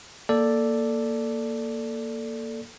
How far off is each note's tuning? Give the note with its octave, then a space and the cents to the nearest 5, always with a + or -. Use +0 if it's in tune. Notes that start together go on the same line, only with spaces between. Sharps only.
A#3 +0 A4 +5 D5 +0